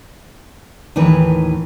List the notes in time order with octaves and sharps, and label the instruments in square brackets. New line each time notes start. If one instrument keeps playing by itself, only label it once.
[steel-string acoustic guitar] D#2 A2 D#3 E3 B4